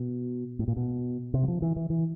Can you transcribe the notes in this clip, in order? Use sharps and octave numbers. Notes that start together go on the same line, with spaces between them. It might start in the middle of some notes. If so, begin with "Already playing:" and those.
Already playing: B2
A2
A#2
B2
C3
F#3
F3
E3
E3
E3